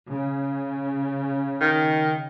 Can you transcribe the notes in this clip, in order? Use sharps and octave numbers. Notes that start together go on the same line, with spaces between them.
C#3
D#3